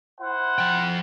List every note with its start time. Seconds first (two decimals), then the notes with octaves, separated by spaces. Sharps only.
0.20 E4 C5 F#5
0.58 F3 G5